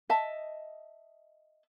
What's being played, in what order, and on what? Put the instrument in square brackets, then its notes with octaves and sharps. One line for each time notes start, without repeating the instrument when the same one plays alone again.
[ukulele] D#5 E5 A5